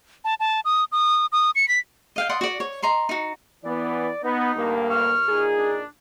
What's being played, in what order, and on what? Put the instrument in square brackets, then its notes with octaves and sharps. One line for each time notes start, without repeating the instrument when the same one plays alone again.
[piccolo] A5
A5
D#6
D#6
D#6
C#7
B6
[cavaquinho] D#5 F5 G5
D5 F#5 C6 D#6
F#4 D5
C#5
D#5 A#5 C6 C#6
D#4 F#4
[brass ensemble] E3 B3 [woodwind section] D5
[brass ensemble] B3 [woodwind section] D#4
[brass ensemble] D2 G2 A#3
[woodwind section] D#2 C#6 F6
[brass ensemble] A#2 D#4 G#4
[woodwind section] D4